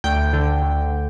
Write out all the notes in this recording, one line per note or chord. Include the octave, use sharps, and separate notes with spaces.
D2 G5
D3
D2